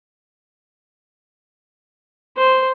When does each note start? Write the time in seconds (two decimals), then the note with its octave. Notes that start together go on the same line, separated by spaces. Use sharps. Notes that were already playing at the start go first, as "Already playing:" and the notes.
2.37 C5